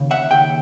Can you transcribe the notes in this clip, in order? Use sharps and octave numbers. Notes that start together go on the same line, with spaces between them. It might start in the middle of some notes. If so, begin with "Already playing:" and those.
Already playing: D#2 C#3
E5 F#5
D#2 C#3 G5